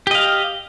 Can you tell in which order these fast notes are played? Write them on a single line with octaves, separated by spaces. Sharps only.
G4 D#5 F5